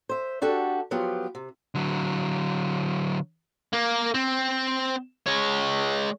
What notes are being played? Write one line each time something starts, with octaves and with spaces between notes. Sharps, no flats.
C5 E5
D4 F#4 G4 A4
F3 F#3 B3 F4 G4
C3
D3 F#3
A#3
C4
G#3 C#5